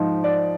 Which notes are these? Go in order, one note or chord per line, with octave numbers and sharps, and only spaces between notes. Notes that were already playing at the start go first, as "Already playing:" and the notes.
Already playing: G#2 F3 D#4
D5